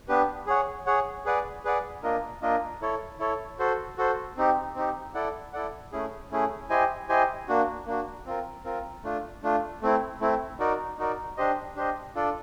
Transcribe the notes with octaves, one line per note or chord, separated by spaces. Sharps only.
B3 D4 G4 B4
G#4 C#5 F#5
G#4 C#5 F#5
G#4 B4 D5 F#5
G#4 B4 D5 F#5
A#3 D4 F4 A#4 D#5
A#3 D4 F4 A#4 D#5
E4 A4 C#5
E4 A4 C#5
F#4 A4 C5
F#4 A4 C5
C4 D#4 G4
C4 D#4 G4
E4 A4 D5 F#5
E4 A4 D5 F#5
A3 C#4 E4 G#4
A3 C#4 E4 G#4
E4 G4 C5 D#5 G#5
E4 G4 C5 D#5 G#5
A#3 D4 F#4
A#3 D4 F#4
C4 F4 A#4
C4 F4 A#4
A3 D4 F4
A3 D4 F4
A3 C4 E4
A3 C4 E4
D#4 F#4 A#4 D5
D#4 F#4 A#4 D5
D4 G4 C5 D#5
D4 G4 C5 D#5
D4 F4 A4 D5